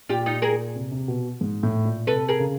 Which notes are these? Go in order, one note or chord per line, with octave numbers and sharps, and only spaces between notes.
A#2 F4 G4
D#4 F4
G#4 A#4
C3
C3
B2
G#2
A2
A#2
C3 A4 B4
G#4 A#4
C#3